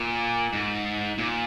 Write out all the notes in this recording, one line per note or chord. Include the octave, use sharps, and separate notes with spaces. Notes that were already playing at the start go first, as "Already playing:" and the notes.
Already playing: A#2
G#2
A#2